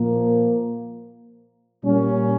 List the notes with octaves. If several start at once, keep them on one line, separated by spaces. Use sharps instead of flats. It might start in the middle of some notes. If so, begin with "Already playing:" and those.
Already playing: A#2 F3 A#3
A#2 G3 A#3 C#4